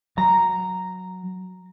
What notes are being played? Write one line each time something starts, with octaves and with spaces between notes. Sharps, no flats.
F#3 A#5